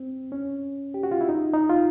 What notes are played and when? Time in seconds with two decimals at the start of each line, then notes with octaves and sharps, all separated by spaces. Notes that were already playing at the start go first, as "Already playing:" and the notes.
Already playing: C4
0.32 C#4
0.94 G4
1.03 F#4
1.12 F4
1.21 E4
1.29 D#4
1.53 D#4
1.69 F4